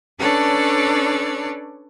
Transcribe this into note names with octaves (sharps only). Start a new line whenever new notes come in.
C#4 D4 A4 B4 C#5 D5